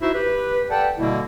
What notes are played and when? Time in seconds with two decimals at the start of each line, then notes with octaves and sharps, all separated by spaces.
0.01 D#4 E4 F#4 C5 E5
0.14 G4 B4
0.70 A4 B4 D5 F#5 G5 A5
0.98 B2 D3 G3 A#3 E4